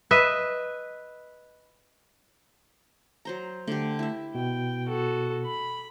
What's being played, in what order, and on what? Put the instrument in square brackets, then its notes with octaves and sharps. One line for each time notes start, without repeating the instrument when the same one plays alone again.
[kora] B4 D#5 E5
[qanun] F#3 C5 A#5
[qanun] D3 G4 [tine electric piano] A3
[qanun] E4 E5
[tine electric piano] B2 [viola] G5
[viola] F#4 A4
B5